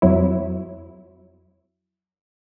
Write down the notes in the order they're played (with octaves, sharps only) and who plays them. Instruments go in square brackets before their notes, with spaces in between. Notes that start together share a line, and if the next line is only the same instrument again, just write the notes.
[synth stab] F2 F#3 E4